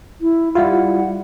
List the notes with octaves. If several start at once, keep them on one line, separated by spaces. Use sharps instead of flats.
E4
G3 E4 F4 F#5